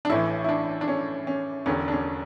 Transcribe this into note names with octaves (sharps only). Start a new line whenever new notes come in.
D4
A1 A2 E3 E4
E4
D4
D4
C#4
C#4
E1 E2 D3 C#4
D4
C#4